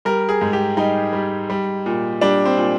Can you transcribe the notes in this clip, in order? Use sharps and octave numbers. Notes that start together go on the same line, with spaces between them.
G3 A#4
G#4
G#2
G4
G3 D#4
G3
G3
A#2
G3 D4
C4
A#2